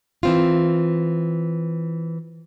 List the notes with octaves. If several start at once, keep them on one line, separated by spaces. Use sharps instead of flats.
E3 C4 F4